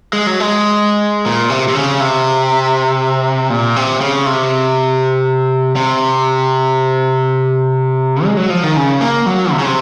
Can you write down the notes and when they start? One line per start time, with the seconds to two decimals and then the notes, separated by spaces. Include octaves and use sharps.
0.13 G#3
0.27 F#3
0.40 G#3
1.26 A#2
1.50 C3
1.68 C3
1.75 C#3
2.01 C3
3.50 A#2
3.76 C3
4.01 C#3
4.26 C3
5.76 C3
8.25 G#3
8.37 F#3
8.50 F3
8.64 D#3
8.77 C#3
9.01 A#3
9.26 F#3
9.52 C3
9.59 C#3
9.66 C3